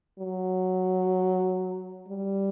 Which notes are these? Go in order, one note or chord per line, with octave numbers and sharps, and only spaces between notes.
F#3
G3